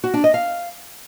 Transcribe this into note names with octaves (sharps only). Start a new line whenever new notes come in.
F#4
D4
D#5
F5